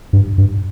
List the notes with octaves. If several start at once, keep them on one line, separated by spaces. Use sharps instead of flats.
G2
G2